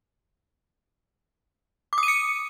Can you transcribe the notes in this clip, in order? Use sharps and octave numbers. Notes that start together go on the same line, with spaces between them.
D6
D#6
D#7
C#7